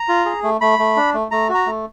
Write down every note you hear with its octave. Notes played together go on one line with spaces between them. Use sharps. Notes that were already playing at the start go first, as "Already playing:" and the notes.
Already playing: A#5
F4
G#4
A3
A3 B5
A3
D4
A3
A3 A#5
F#4
A#5
A3